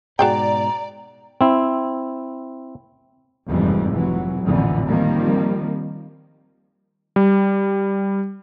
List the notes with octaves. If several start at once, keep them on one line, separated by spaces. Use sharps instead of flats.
G#2 B2 F#4 G#4 D5 G5 A#5
C4 E4
F#1 F2 G#2 C3 E3 G3
F1 E3 F#3
A1 F2 A#2 D3 E3 C4
D#3 F3 G3 A#3 C4
G3